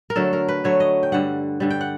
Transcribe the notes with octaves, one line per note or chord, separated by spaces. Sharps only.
A#4
D3 F#3 A3 A4
A#4
B4
D3 F#3 A3 C#5
D#5
G5
G2 D3 G3 F#5
G2 D3 G3
G5
F#5